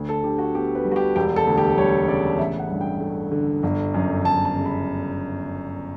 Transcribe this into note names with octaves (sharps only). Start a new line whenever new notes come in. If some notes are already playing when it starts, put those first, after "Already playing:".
Already playing: D2
A4
D3 G4
F#4
B3 G4
B4
G3
F#4
G4
E1 G4
A4
D2
G4
G3 C#5
C#3 D5
A1 E5
F#5
G2
G5
A3
D3
G1
F#2
G1 A5
A5
C#3
B5